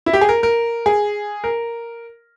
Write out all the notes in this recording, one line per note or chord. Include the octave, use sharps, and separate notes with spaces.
E4
G4
G#4
A#4
A#4
G#4
A#4